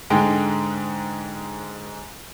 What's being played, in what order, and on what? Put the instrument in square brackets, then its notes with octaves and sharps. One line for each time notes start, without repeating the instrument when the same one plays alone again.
[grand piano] G#2 D3 G#3 G5